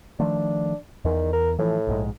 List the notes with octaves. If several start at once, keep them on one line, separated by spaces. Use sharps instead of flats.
D#3 F3 A3 D4
E2 D#3
A#4
A2 E3 F3
A#1 G#2 G#3